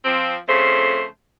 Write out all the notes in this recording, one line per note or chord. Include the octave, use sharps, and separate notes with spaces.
F3 C4
F2 C#3 A3 C5